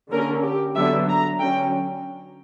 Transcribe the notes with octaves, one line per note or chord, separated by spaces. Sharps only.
D3 A#3 C#4 A#4
G4
D3 F#3 B3 D4 E5
A#5
D3 F#3 C#4 G5